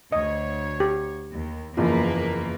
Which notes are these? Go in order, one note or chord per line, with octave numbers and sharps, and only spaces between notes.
D2 C#5 D#5
G4
D#2
F#1 E2 F3 A#3 B4